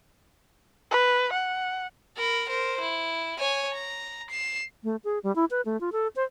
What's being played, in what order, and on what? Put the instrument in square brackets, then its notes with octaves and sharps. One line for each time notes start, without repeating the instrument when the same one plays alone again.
[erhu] B4
F#5
[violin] A#4 B5
A#4 C5
E4
C#5 G#5
A#5
C7 E7
[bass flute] A3
G#4
G3
E4
B4
A3
F4
A4
C5